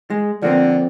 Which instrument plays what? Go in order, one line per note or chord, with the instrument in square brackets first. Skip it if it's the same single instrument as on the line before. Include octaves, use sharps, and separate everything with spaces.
[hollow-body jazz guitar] G#3
[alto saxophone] D3 [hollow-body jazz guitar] F3 A#3 C4